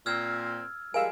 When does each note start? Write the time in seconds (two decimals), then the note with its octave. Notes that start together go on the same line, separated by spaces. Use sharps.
0.06 A#2 C4 E6 F6 G#6
0.94 F3 G3 G#3 A#4 F5 G#5 E6